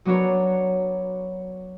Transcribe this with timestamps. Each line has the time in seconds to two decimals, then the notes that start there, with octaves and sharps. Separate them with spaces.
0.05 F#3 B3 D4 F#4 A#4 C#5